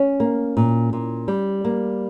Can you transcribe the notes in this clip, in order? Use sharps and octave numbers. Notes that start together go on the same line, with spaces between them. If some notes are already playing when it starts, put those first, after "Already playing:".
Already playing: C#4
A#3
A#2
A#2
G3
A#3